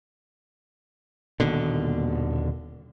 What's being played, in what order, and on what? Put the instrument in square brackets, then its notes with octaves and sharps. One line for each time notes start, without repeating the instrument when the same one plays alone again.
[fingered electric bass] D#1 D#2 B2 D3